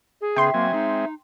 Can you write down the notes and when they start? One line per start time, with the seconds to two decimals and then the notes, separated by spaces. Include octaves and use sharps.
0.21 G#4
0.36 C#3 B3 E5 G5 C6
0.54 F#3 A#3 C4 G#5
0.73 G#3 C4 D#4